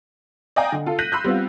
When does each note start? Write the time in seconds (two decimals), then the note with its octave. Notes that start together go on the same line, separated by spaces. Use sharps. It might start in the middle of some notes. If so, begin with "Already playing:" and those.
0.56 D5 D#5 F5 G5 G#5 A#5
0.72 D3
0.86 F4 A4
0.99 F#6 G6 A#6 B6 D#7 F#7
1.12 B5 C6 E6 F#6 G6
1.24 G3 B3 C4 F4